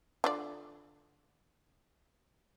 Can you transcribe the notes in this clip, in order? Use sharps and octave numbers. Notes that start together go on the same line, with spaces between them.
D3 F4 D5